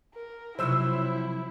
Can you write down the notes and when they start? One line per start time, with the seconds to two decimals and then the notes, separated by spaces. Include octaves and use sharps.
0.14 A#4
0.59 C3 F3 F#3 E4 C5 E6